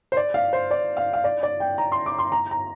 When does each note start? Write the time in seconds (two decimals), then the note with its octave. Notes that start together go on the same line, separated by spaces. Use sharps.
0.12 C5
0.17 D5
0.34 F5
0.53 C5
0.71 D5
0.97 F5
1.13 F5
1.24 D5
1.43 D5
1.60 G5
1.78 A#5
1.92 C6
2.06 D6
2.18 C6
2.32 A#5
2.51 A#5